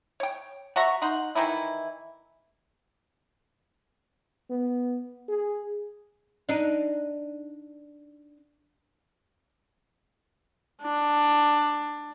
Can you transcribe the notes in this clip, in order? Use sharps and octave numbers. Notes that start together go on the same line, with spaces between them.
C#5 G5
F#4 E5 A#5 C#6
D#4 F#5 C6
D#3 E3 D#4 E4
B3
G#4
D4 D#4
D4